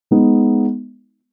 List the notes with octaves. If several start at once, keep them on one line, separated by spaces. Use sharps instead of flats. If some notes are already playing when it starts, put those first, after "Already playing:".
G#3 B3 D#4